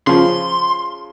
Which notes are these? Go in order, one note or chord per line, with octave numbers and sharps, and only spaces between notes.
C#3 F3 C6